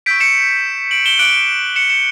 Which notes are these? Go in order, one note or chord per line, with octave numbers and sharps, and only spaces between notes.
C#6 E6 G6 B6 D7
C#7 E7
D7 F#7
E7 G7
D6 F#6 D7 F#7
C#7 E7
C#7 E7